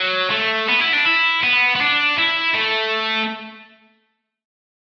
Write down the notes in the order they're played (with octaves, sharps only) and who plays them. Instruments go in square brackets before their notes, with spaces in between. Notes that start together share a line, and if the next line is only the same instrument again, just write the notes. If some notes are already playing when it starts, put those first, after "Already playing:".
Already playing: [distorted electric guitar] F#3
A3
B3
E4
D4
E4
B3
B3
D4
E4
A3